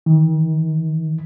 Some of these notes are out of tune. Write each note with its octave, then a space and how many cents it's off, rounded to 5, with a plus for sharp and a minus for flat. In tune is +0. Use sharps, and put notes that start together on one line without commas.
D#3 +40